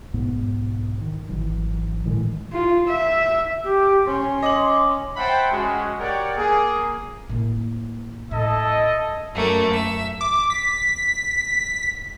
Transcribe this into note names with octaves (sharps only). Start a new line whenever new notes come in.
B1 G#2 B2 B3
D#3
G#1 E3 F#3
A2 D#3 E3 G#3
F4
E5
G4
C#4 C6
D#5 D6 F#7
C5 E5 F#5 G5 A5 B5
G#3 C#4 F#4
G4 A#4 C#5 D5 F#5 G5
A#3 G#4
A2 A#3
A2 E4 A4 D#5
F#2 A3 A#3
E5
D6
B6